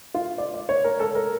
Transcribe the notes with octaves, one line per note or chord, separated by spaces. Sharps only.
F4
D5
D5
C#5
A#4
A4
A#4